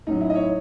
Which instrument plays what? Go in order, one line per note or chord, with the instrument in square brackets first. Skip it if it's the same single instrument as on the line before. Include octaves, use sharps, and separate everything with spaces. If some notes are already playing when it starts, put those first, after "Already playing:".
[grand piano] A2 F#3 C#4 D#4
E4
D#5
C#5